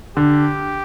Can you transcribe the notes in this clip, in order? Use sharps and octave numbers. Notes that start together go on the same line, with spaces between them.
D3 G4